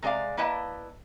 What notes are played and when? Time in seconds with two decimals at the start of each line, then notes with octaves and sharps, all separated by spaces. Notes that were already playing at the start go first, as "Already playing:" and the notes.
0.02 C3 G#3 G#4 D5 F5
0.37 A#3 E4 B4 D#5 A5